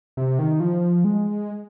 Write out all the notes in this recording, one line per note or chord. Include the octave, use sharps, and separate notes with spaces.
C3
D#3
F3
G#3